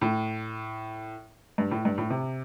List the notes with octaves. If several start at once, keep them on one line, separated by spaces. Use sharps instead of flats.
A2
G2
A2
G2
A2
C3